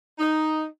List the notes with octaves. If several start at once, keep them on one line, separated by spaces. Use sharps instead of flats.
D#4